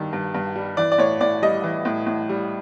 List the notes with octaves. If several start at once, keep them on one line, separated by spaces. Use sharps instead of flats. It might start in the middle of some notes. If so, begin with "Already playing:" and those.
Already playing: G2 D#3 G3
G2
G2
G3
E3 D5
D5
A2 C#5
A2 D5
G3 D#5
E3
A2
A2
G3